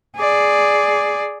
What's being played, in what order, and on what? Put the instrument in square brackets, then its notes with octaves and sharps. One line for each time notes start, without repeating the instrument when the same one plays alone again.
[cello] G#4 D5